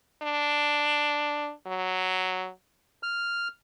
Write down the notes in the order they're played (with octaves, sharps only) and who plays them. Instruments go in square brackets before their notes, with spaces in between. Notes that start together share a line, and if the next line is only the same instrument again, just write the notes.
[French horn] D4
F#3
[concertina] F6